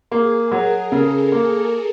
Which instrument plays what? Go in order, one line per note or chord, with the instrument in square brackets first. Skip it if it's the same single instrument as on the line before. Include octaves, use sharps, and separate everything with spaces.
[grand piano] A#3 [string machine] G#4
[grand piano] F#3 [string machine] A#4
[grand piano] C#3 [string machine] A4
[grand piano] A#3 [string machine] G#4